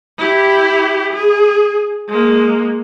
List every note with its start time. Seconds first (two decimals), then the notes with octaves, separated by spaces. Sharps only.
0.18 E4 G4
1.13 G#4
2.08 G#3 A#3